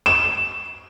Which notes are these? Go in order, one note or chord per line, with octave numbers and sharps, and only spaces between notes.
E7